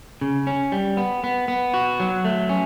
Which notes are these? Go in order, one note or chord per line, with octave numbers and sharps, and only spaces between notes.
C#3
C#4
G3
B3
B3
B3
F#4
F#3
A3
C#4